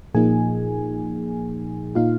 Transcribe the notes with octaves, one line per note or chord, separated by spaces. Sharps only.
A#2 F3 A#3 D#4 G#4 G#5
A#2 A#3 D#4 F4 F5